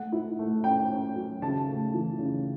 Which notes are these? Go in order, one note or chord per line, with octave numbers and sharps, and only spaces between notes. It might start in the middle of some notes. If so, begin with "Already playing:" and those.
Already playing: A3 F#5
E4
A3
C#4 G5
C#4
F#3
C#3 A5
A3
E3
C#3